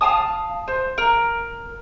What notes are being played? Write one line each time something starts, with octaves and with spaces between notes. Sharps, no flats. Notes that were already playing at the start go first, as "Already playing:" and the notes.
F5 G#5 A5 D#6
C5
A#4